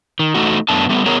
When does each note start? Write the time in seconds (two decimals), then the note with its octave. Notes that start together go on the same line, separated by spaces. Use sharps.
0.19 D#3
0.35 E2 A3 D#4 F#4
0.69 F#2 A3 B3 D4 A5
0.89 G3 A3 B3
1.06 B3 G#4 A#4 C#5